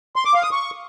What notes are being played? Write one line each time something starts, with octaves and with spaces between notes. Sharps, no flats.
C6
D6
F5
D#6
C#6